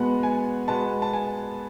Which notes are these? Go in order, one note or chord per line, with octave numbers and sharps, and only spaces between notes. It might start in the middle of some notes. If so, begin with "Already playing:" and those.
Already playing: B2 G#3 B3 F#5
G#5
B2 G#3 B3 A5
A5
G#5